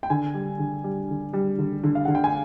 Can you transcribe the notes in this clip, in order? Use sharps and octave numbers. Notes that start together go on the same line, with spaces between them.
G5
D3 G#5
G3
D3
G3
D3
G3
D3
D3
F5
D3 F#5
G5
G#5